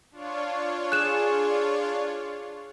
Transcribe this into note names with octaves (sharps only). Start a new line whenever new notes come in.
D4 F4 C#5
G#4 F#6 E7